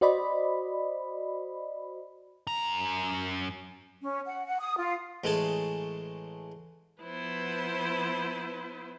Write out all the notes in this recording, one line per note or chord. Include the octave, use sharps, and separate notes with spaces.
F#4 C5 D5 D#5 B5
F#2 A#5
C#4
F#5
F#5
D#6
F4
A1 G#3 A3 G#4 A5
F3 B3 E4 B4 C5